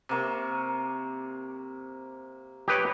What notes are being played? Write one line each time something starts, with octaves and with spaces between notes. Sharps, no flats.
C3 A#3 C#6
G4 B4 C#5 D#5